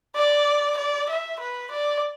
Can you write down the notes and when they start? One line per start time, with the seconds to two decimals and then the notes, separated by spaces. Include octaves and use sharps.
0.15 D5
0.77 D5
1.09 E5
1.39 B4
1.71 D5